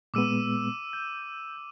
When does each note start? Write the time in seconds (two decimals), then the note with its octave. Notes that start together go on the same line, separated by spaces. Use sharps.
0.14 A#2 G#3 B3 D6 E6 D#7
0.93 G6